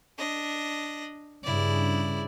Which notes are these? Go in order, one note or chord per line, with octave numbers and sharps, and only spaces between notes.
D4 D#5
G2 C#3 E4 D5